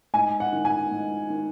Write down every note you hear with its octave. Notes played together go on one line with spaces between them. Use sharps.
G#2 G#5
F#5
D#3
G#5
G#2
D#3